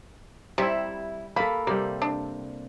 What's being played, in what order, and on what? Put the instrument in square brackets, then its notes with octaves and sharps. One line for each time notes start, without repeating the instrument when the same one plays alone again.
[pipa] C3 E4 [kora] G3 E5
[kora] A#3 A4 [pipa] B5
[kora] C3 G3 [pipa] A#3
[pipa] D4